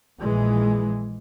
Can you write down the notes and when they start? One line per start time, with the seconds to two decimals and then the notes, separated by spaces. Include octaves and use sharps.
0.21 A#1 A#2 E3 G#3